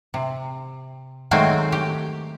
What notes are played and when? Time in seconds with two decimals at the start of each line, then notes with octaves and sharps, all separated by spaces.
0.14 C3
1.31 D#3 F#3 G#3 A3 C4
1.72 G4